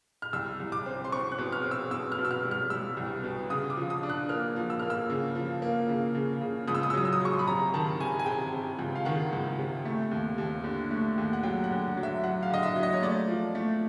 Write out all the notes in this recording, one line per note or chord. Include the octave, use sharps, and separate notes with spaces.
F6
C2 E6
C2
D6
C4
C6
C4 C#6
F#6
B2
F6
C4
E6
B2 E6
F6
B2
E6
F6
G3
F6
G3 E6
C2
B2
C#3 D#6
D6
F3
D#6
D4
F#6
A#3 F6
F3
E6
A#3 F6
E6
C#3
F3
A#3
C#3
C#3
C#3
C#2 D#6
E6
D#6
E6
F#3 D#6
E6
D#6
F#3 C#6
C6
B5
C3 A#5
D#3 A5
C3 G#5
G#5
C3 G5
C3
C#2
F5
D#3 F#5
C#2
C3
A3
D#2
D#2
D3
A3
D#2
F#5
F#3 G5
F#5
D3
F#3
E5
F#3 F#5
F5
D3 D#5
E5
F#3
D#5
C#5
A3 D5
F3
A3